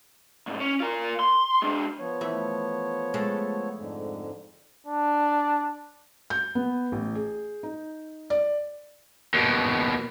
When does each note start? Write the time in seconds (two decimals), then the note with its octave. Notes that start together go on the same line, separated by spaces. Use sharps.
0.47 C2 G#2
0.60 C#4
0.80 F4 A#4
1.20 C6
1.62 G#3 D4
1.99 F3 B3 C#5
2.21 E3 A3 E5
3.14 G#3 A3
3.77 F2 G#2 D3
4.86 D4
6.30 G6
6.55 B3
6.92 A1
7.15 G#4
7.63 D#4
8.30 D5
9.34 D#2 B2